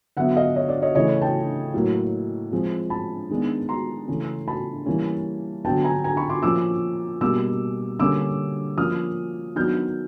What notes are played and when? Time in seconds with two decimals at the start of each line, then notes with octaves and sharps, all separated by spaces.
0.17 D3 F#3 B3 E5 F#5
0.36 D#5 F5
0.56 C#5 D#5
0.69 D5
0.82 C#5 D#5
0.95 C#3 E3 A3 C#5 D#5
1.22 G5 A5
1.74 A2 F#3 A#3
2.52 F3 G#3 C4
2.90 A5 B5
3.30 D#3 G#3 B3 D4
3.69 A#5 C6
4.08 C#3 E3 A3 C#4
4.48 A5 B5
4.86 E3 G3 A#3 C#4
5.65 D3 F#3 B3 D4 G5 A5
5.84 G#5 A#5
6.04 G#5 A#5
6.17 B5 C#6
6.29 C6 D6
6.42 A#2 F3 A#3 C#4 D6 E6
7.21 B2 G3 A#3 D6 E6
8.00 D3 G3 A#3 C#4 D6 E6
8.78 F3 A#3 C#4 D#6 F6
9.56 D#3 F#3 B3 D4 F6 G6